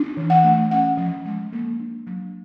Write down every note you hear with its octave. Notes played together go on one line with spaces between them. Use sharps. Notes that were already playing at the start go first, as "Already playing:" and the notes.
Already playing: D4
E3
F#5
A3
C#4 F#5
F3
G#3
A#3
D4
F#3